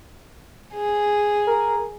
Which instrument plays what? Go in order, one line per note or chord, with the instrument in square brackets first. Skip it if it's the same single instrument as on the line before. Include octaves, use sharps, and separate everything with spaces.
[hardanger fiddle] G#4
[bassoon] A#4